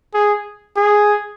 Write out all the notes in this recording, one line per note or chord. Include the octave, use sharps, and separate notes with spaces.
G#4
G#4